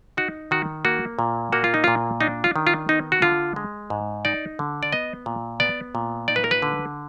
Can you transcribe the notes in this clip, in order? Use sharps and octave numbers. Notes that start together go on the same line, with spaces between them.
D#4 F#4
D#3 F#4
A#3 F#4
A#2
A#3 F#4
F4
D#4
A#2 F4
D4 D#4
F4
D#3
F4
B3 D#4
F#4
D3 F4
G#3
G#2
D#4 D5
D3
D5
B3 D#5
A#2
B3 D5
A#2
D#4 D5
B4
A#4
B4
D3